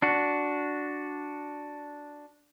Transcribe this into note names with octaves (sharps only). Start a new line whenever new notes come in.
D4 F#4